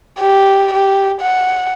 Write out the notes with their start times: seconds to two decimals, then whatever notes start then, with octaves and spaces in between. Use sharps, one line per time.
0.19 G4
0.73 G4
1.21 F#5